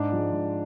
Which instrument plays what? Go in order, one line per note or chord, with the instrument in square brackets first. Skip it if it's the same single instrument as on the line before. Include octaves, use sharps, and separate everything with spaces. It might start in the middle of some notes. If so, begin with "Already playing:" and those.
Already playing: [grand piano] G#2 D4 D5
F3 G#3
G#2